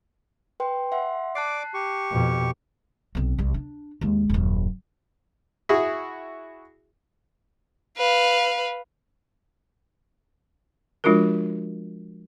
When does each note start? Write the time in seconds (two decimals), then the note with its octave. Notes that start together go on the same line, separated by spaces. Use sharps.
0.60 B4 G5 C6
0.92 E5 F#5 C6
1.35 D5 A5 D6 F#6 C7
1.74 G4 C#6
2.10 F2 B2
3.15 B1 C4
3.38 C2 G3
3.54 D4
4.01 D#2 G#3
4.29 D#1 F#2
5.69 E4 F#4 G#4
7.98 B4 F5
11.04 F3 G#3 D4 F4 F#4 A#4